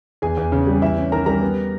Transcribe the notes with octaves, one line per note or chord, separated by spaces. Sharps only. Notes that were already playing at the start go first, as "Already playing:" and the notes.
E2 G#4 G#5
E2
C#3
G3
E2 E4 E5
C#4
D#3 A#4 A#5
G3 A#4 A#5
B3